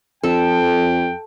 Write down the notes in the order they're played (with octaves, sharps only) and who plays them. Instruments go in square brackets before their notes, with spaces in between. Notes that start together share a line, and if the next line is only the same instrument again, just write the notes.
[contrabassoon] F2 [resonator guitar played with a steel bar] A4 [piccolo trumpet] G5